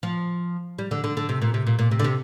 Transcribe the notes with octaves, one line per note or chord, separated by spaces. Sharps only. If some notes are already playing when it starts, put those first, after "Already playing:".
F3
G3
D3
D3
D3
C3
A#2
C3
A#2
A#2
C3
D3
C3